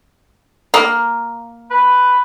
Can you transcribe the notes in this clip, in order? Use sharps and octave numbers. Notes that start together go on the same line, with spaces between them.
A#3
B4